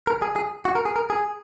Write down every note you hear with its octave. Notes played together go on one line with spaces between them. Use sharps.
A#4
G#4
G#4
F#4
A#4
G#4
A#4
G#4